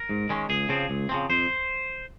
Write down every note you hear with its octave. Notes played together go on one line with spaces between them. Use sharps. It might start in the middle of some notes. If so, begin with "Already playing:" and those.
Already playing: A#4
G#2
D#3 G#3 C#4
C#2 G#4
C#3 F3 C4
C#2
C#3 F3 C4
F2 C5